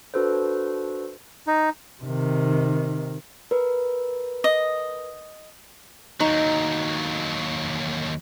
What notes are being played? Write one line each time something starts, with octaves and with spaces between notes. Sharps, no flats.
D4 F#4 A4 B4 C5
D#4
C3 D#3
A#4 B4
D#5
D#2 F#3 D#4